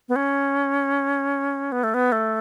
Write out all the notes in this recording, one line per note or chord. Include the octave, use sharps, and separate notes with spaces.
B3
C#4
B3
A3
B3
A3